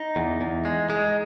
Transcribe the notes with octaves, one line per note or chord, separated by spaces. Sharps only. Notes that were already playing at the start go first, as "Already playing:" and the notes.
Already playing: D#4
E2
E2
G#3
G#3